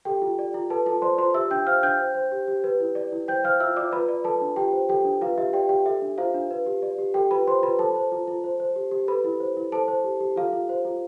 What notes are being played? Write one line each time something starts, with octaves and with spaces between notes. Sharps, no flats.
G4 A4 G5
F4
D5
F4
A4 B4 A5
F4 A4 A5
C5 D5 C6
F4 C5 C6
G4 E5 E6
D4 G5 G6
C5 F5 F6
D4 G5 G6
C5
C5
G4
G4
B4
E4
D5
E4
C5 G5 G6
C5 F5 F6
F4 E5 E6
F4 D5 D6
F4 B4 B5
D5
A4 B4 A5
D4
F4 G4 G5
C5
G4 A4 G5
D4
F4 B4 F5
G4 E5
G4 D5 G5
G4 G5
A4 E5
D4
F4 C5 F5
D4
B4
G4
D5
G4
G4 A4 G5
F4 B4 B5
C5 C6
F4 B4 B5
A4 C5 A5
C5
F4
F4
C5
C5
G4
G4
A4 B4 B5
E4
C5
E4
A4 C5 A5
C5
G4
G4
F4 A4 F5
F4
C5
F4